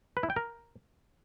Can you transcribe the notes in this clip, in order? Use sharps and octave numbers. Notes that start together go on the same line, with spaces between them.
B4
E4
G5
A#4